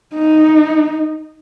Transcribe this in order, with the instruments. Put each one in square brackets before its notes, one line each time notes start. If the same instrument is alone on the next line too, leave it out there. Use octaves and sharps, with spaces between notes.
[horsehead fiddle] D#4